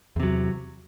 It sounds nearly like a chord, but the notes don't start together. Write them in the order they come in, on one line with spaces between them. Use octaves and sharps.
E2 C3 F#3